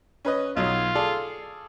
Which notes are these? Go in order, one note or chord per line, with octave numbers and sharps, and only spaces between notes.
C#4 B4 D#5
B1 F#3 D#4 F4
G#4 A4 D5